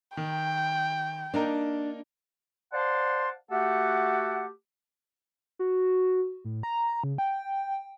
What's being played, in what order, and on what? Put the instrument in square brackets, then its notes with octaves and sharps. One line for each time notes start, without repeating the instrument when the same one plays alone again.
[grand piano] D#3 [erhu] G5
[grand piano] A#3 D#4 A#4 [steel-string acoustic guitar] D4
[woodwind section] C5 D5 F5 F#5 A5 C6
A3 F#4 G4 A4 F#5
[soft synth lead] F#4
A2
A#5
C#3
G5